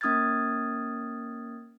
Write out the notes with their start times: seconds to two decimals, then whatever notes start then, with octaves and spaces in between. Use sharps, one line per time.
0.01 A#3 C#4 D#6 F6 G#6 A6